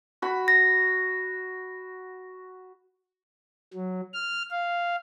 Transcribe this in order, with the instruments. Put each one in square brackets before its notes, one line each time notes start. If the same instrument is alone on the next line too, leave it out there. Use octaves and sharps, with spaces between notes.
[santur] F#4 B5
[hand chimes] A#6
[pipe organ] F#3
F6
F5